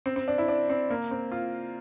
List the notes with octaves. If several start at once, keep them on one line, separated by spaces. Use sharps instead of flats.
C4
C4
D4
E4
D4
C4
A#3
C4
F4